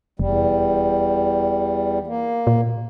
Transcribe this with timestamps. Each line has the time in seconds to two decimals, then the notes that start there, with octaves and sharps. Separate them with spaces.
0.19 F1 E2 G3
2.07 A#3
2.47 A#2